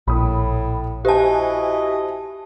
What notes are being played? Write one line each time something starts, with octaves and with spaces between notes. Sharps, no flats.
A#1 A2 B5 D#6
E4 F#4 G4 C5 D#5 G#5 A5